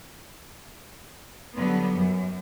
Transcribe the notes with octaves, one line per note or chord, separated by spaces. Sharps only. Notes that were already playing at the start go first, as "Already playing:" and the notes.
D3 F#3 G3 B3
F#2